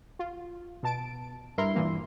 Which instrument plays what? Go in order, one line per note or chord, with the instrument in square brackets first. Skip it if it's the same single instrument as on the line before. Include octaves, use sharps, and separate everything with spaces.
[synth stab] F4
B2 A5 D7
[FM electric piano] G2 E4 C6 [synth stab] A#4
[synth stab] A#2 E3 A#3